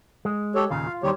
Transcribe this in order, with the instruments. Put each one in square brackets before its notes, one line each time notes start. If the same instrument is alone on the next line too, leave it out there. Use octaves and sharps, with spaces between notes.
[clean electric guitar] G#3
[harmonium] G4 A4 C#5
[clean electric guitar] D#2 A#2 C#3 [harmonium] F5
[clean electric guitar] F4
[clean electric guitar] D#2 D#3 C5 [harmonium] G3 G4 C#5